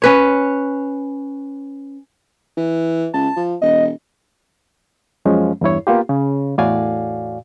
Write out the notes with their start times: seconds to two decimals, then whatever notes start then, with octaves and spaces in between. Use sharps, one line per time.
0.02 C#4 B4 C#5
2.57 E3
3.14 C#2 A5
3.37 F3
3.62 E1 D#5
5.25 F#2 F3 G#3 C#4
5.61 E2 G2 E4 C#5
5.87 A#3 B3 F4 G4
6.09 C#3
6.58 E2 A2 F#4 D5 F5 G#5